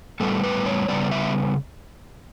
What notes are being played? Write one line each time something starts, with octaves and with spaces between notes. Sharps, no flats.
A2 G3 B3 A4
B4
C#5
C#3 G3 B3 D5
E5